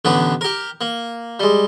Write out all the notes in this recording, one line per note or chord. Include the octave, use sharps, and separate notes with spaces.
A1 D3 B3 B4
G4 A#4
A#3
G3 G#3